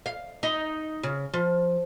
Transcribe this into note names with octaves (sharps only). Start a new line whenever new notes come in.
F5
D#4
C#3
F3